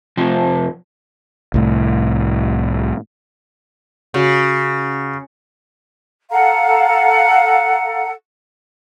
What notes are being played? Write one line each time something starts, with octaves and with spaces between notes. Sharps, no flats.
F2 C3 F3
C2 A2
C#3 F#4
A4 F5 F#5 A#5